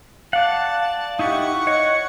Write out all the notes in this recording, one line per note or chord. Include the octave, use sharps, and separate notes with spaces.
D5 F5 F#5 A5
D#4 E4 G4 F#5 C#6
C#5 D#5